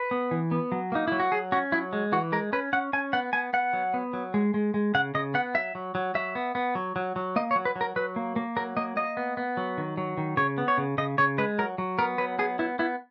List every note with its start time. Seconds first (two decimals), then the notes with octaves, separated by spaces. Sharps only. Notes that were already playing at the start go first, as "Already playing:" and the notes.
Already playing: B4
0.11 B3
0.31 E3
0.51 B3
0.72 F#3
0.92 A#3 D#4
1.08 F#3 E4
1.20 F#4
1.32 F#3 G#4
1.52 C#4 F#4
1.72 F#3 E4
1.93 G#3
2.12 E3 F#4
2.32 G#3 A#4
2.53 C#4 B4
2.73 C#4 F#5
2.93 C#4 G#5
3.13 B3 F#5
3.33 B3 G#5
3.53 B3 F#5
3.73 F#3
3.94 B3
4.13 F#3
4.34 G#3
4.54 G#3
4.74 G#3
4.94 C#3 F#5
5.15 C#3 D#5
5.34 B3 F#5
5.55 F#3 E5
5.75 F#3
5.95 F#3
6.15 F#3 E5
6.35 B3
6.55 B3
6.75 F#3
6.96 F#3
7.16 F#3
7.36 A#3 D#5
7.51 C#5
7.56 F#3
7.65 B4
7.76 F#3
7.81 A#4
7.96 F#3 B4
8.16 A#3
8.36 A#3
8.56 F#3 A#4
8.77 A#3 D#5
8.97 A#3 D#5
9.17 B3
9.37 B3
9.57 F#3
9.78 D#3
9.97 F#3
10.17 D#3
10.37 C#3 C#5
10.58 B3
10.68 C#5
10.78 C#3
10.98 C#3 D#5
11.18 C#3 C#5
11.38 G#3 B4
11.59 F#3 A#4
11.78 F#3
11.99 B3 A#4
12.18 F#3 B4
12.39 B3 G#4
12.59 B3 E4
12.79 B3 E4